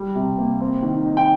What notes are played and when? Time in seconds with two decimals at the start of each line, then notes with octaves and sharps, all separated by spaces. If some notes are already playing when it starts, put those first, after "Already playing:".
Already playing: G3
0.15 C3
0.38 A#3
0.61 C4
0.82 D#3
1.06 D#4
1.17 G5